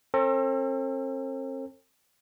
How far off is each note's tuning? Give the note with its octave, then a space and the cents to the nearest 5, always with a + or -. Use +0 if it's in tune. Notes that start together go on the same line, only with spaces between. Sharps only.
C4 +40 A4 +40